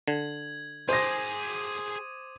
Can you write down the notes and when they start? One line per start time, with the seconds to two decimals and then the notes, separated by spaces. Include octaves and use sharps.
0.08 D3 G#6 F#7
0.89 G#4 C5 G5 D6 D#6 A#6 D#7